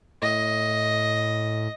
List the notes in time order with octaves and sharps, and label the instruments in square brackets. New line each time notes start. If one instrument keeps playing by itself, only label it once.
[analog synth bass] A2 [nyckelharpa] D#5